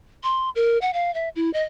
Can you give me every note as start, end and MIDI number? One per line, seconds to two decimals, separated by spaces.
0.23 0.50 84
0.55 0.78 70
0.82 0.91 78
0.94 1.13 77
1.14 1.29 76
1.36 1.52 64
1.53 1.64 75